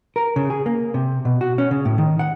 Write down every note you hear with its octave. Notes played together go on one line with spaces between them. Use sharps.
A#4
C#3
G#4
A#3
C3
B2
F#4
C#4
C#3
A2
D#3
F#5